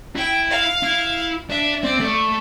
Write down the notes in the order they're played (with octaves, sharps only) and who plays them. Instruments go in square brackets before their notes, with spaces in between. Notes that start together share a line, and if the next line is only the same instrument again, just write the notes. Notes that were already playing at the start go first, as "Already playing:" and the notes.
[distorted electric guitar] E4 [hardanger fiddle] G5
[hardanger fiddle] F5
[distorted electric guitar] E4
[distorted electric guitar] D4 [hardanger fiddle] E5
[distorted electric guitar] C4 [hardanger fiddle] D5
[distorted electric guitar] A3